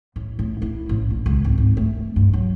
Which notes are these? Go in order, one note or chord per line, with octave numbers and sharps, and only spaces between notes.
A1
A2
E4
A1
A#1
C#2
G#1
G#1
A3
G2
F#3